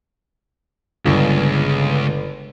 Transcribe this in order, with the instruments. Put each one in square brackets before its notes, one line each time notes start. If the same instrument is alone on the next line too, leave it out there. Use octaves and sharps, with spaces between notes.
[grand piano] G1 [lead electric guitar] C#2